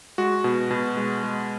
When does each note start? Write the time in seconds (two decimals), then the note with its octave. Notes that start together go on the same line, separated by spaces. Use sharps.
0.18 G#3 F#4
0.44 B2
0.71 B2
0.97 G#3
1.23 G#3